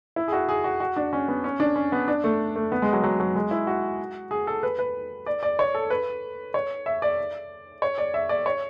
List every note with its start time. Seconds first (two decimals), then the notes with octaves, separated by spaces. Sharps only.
0.16 E4
0.28 G#4
0.33 F#4
0.49 G#4
0.64 F#4
0.80 F#4
0.96 D4
1.13 C#4
1.28 B3
1.44 C#4
1.60 D4
1.76 C#4
1.92 B3
2.08 D4
2.24 A3
2.56 A3
2.72 B3
2.82 G#3
2.93 F#3
3.03 F#3
3.20 F#3
3.35 G#3
3.51 E4
3.67 F#4
4.31 G#4
4.47 A4
4.63 B4
4.79 B4
5.26 D5
5.43 D5
5.59 C#5
5.74 A4
5.90 B4
6.54 C#5
6.86 E5
7.02 D5
7.82 C#5
7.98 D5
8.14 E5
8.29 D5
8.46 C#5